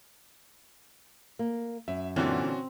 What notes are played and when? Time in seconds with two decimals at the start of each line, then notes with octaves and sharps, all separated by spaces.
1.39 A#3
1.88 F#2 E5
2.16 A#2 D3 E3 C4 C#4 F#4